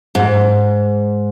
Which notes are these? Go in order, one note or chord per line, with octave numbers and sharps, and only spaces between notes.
G#2